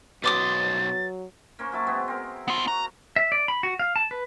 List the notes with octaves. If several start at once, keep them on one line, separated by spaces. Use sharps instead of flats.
B1 F#3 B4 C5 D6 D#6 A6
A#3 C#4 C5
F#3 E4 A5
G#3 B3 C4
C4 A#4
B3 F4
F#4 A#5
E5
D5
B5
F#4
F5
A5
B4